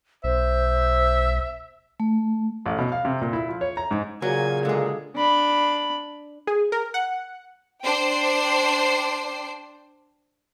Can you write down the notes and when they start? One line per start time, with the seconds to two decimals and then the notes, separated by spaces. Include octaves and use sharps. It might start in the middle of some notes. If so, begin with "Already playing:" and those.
0.24 B1 C5 E5
2.00 A3
2.66 A1
2.79 B2
2.92 F5
3.05 C3
3.21 A#2
3.33 E4
3.49 F3
3.61 C#5
3.77 A#5
3.91 G#2
4.22 A#2 C#3 F#3 G#5
4.65 D3 G#3 G#4
5.16 D4 B5
6.47 G#4
6.72 A#4
6.94 F#5
7.84 D4 C5 G5 C7